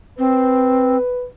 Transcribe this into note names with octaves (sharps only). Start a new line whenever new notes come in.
C4 B4